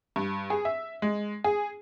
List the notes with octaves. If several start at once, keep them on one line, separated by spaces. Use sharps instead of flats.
G2
G#4
E5
G#3
G#4